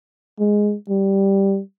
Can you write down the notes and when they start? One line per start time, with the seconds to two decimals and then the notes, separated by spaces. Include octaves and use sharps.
0.40 G#3
0.89 G3